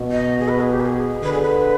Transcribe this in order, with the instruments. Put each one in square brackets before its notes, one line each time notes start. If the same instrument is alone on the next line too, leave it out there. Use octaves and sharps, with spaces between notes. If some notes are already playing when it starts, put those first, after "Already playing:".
Already playing: [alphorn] B2
[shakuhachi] D#5
G#4
B4
G#4
G4
B4
G#4
[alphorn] D3 [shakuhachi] B4
[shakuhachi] G#4
B4